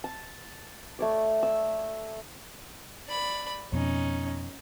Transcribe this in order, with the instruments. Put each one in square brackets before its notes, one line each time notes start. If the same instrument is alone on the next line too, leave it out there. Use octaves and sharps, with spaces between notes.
[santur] A5
A3 C#5 D5
E6
[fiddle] D5 B5
[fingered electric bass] F2 B2 [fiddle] C#4 D#4